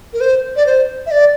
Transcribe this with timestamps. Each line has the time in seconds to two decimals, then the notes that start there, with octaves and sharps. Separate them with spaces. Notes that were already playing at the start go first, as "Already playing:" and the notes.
0.13 A#4
0.21 C5
0.56 D5
0.66 C5
1.06 E5
1.11 D5